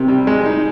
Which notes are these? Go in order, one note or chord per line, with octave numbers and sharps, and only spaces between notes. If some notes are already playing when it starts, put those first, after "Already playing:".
Already playing: C3 D#3 C4
G3
G#3
D#4